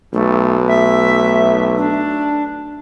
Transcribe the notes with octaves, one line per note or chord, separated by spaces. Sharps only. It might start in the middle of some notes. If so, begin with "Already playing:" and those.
B1 A3
A3 E5
D4